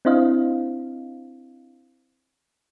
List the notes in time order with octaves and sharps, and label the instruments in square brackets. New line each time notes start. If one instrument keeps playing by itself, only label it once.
[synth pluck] C4 D4 E4 C5 D#5 F5